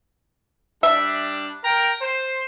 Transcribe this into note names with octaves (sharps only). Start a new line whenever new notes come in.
G3 D4 E5
A#4 G5 A#5
C5